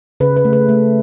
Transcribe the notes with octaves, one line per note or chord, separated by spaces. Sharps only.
C#3 B4
B4
A3
B4
A3